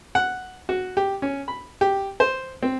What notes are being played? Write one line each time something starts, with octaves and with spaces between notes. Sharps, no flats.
F#5
F#4
G4
C#4
B5
G4
C5
C4